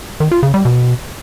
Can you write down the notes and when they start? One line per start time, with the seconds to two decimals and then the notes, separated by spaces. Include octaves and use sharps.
0.20 D#3
0.31 F4
0.43 C#3
0.54 G3
0.65 B2